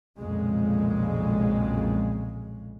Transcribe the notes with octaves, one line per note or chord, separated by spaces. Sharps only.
B1 F2 A#2 C#3 G#3